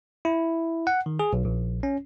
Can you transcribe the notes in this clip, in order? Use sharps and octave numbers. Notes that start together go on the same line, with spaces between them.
E4
F#5
D#3
G#4
B1
A#1
C#4